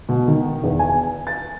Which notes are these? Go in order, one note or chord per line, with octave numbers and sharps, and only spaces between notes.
B2
D#3
E2
G#5
A6